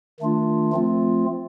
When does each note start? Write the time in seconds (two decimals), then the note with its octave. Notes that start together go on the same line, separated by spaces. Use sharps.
0.20 D#3 A3 D4 F4
0.73 F3 A3 C4 F4